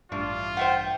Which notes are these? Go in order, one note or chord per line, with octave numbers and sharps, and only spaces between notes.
A1 G2 A3 D4 F4
C5 E5 F#5 G5